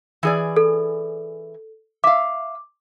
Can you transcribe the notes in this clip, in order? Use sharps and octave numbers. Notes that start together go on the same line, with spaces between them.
E3 G#4 D5
A4
E5 F5 D6